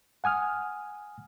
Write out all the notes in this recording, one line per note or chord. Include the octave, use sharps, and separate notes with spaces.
F#5 G#5 D#6 F6